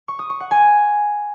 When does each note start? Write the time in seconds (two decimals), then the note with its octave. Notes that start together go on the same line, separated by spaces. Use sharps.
0.08 C#6
0.19 D#6
0.30 C#6
0.40 F#5
0.51 G#5